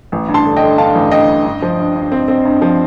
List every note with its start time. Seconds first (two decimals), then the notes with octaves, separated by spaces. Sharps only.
0.12 A1
0.28 G2
0.34 A5 C6
0.45 D3
0.56 D#5 G5
0.62 D3
0.78 G2 F5 A5
0.95 A1
1.12 G2 D#5 G5
1.29 G2
1.45 G2
1.62 F3
1.79 G2
1.95 G2
2.12 C4
2.28 C4
2.45 G2
2.62 F3